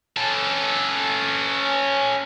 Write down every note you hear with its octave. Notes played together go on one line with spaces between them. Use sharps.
C#4 A4